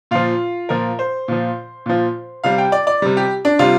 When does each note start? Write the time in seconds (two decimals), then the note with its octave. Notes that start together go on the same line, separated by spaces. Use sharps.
0.11 A#2 F3 F4
0.69 A#2 F3 A#4
0.99 C5
1.28 A#2 F3
1.86 A#2 F3
2.44 C3 G3 F5
2.58 G5
2.72 D5
2.87 D5
3.02 C3 G3
3.17 G4
3.45 D4
3.59 C3 G3 F4